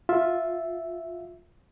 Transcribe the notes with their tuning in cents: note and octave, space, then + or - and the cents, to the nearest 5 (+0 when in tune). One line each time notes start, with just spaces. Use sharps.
F4 +10 E5 +0